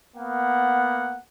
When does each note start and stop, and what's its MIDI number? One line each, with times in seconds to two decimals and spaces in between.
0.17 1.17 58
0.17 1.17 59
0.17 1.17 78